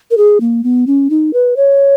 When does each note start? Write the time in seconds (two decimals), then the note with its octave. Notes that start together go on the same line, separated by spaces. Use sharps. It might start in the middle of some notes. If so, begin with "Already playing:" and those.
0.11 A#4
0.17 G#4
0.41 A#3
0.64 B3
0.87 C#4
1.10 D#4
1.33 B4
1.56 C#5